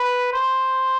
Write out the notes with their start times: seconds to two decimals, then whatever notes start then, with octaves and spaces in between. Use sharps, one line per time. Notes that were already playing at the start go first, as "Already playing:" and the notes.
Already playing: B4
0.33 C5